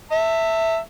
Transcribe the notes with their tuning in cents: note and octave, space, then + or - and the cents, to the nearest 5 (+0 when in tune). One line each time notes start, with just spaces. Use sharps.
E5 +0 A5 +35